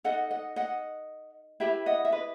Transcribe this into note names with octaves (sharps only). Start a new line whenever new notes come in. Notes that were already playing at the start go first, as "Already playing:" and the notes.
D#4 A4 D#5 F#5
D#5 F#5
D#5 F#5
E4 G4 B4 E5 G5
D#5 F#5
E5
B4 D#5